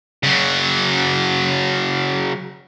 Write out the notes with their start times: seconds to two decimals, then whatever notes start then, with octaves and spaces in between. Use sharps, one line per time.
0.23 C#3 F#3